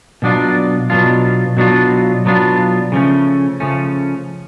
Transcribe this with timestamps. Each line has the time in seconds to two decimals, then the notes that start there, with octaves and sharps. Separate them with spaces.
0.22 B2 F#3 B3 D4 F4
0.90 B2 F#3 B3 D4 F4
1.57 B2 F#3 B3 D4 F4
2.25 B2 F#3 B3 D4 F4
2.92 C#3 F3 A3 C#4
3.60 C#3 F3 A3 C#4